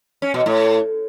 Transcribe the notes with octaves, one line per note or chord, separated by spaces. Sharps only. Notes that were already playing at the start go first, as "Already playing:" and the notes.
C#4
B2
A2